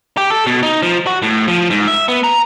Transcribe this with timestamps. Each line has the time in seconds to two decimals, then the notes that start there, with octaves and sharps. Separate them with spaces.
0.17 G4
0.30 A4
0.46 B2
0.63 D#4
0.82 F3
1.07 F#4
1.22 A2
1.48 F3
1.70 G#2
1.88 E5
2.08 B3
2.24 A#5